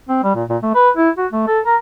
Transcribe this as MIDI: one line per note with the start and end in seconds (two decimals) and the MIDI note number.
0.09 0.20 60
0.23 0.34 55
0.35 0.44 46
0.49 0.57 46
0.63 0.70 57
0.75 0.90 71
0.97 1.10 64
1.18 1.27 66
1.32 1.43 57
1.47 1.60 69
1.66 1.76 70